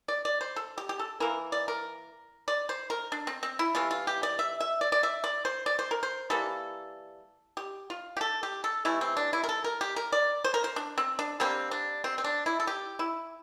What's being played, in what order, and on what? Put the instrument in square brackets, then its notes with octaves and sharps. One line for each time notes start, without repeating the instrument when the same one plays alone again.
[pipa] D5
D5
C5
A4
G4
G4
A4
E3 A#3 A#4
D5
A#4
D5
C5
A#4
D4
C4
C4
E4
C3 E3 A3 F4
F4
G4
D5
E5
E5
D5
D5
E5
D5
C5
D5
C5
A#4
C5
E3 G3 A#3 A4
G4
F4
G4
A4
G4
A4
C3 E3 A3 E4
C4
D4
E4
A#4
A4
A#4
G4
A#4
D5
C5
A#4
C5
D4
C4
D4
D3 G3 A#3 C4
D4
C4
C4
D4
E4
A4
G4
E4